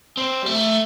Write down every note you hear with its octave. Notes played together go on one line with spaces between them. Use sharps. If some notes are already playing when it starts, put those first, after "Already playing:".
C4
G3
A3